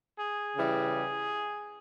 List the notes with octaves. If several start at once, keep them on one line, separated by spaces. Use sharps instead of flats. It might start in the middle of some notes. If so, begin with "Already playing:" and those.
G#4
C#3 E3 G3